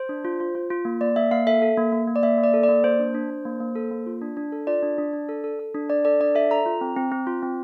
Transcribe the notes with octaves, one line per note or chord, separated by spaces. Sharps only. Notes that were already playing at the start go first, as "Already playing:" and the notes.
Already playing: C5
D4
F4
F4
F4
F4
A#3
A#3 D5
A#3 E5
A#3 F5
A4 E5
A4
A#3
A#3
A#3
D5
A#3 E5
A#3
D5
A4
D5
A#3
A#3 C5
D4
D4
D4
A#3
A#3
A4
A#3
F4
D4
D4
A4
F4 D5
D4
D4
D4
A4
A4
A4
D4
D4 D5
A4 D5
D4 D5
A4 E5
A4 A#5
F4
C4
C4
C4
F4
C4